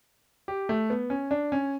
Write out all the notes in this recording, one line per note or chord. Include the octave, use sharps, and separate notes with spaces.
G4
A3
B3
C#4
D4
C#4